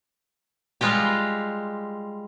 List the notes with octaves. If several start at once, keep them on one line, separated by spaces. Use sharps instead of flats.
G3 G#3 F4 G4